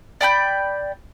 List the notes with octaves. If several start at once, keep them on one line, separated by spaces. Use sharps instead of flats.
D5 G5 B5 G6